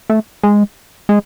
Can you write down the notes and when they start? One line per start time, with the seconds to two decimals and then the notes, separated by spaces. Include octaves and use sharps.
0.10 A3
0.43 G#3
1.09 G#3